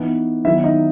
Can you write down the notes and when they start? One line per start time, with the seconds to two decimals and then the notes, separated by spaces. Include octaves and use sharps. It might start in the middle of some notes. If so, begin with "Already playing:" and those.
Already playing: E3 B3 D#4
0.45 D#3 F#3 B3 D#4 E4 E5
0.64 D#4 D#5